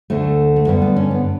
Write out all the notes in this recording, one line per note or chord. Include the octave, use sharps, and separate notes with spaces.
D2 D3 A3
A3
G2 D3 B3
B3
C#4
B3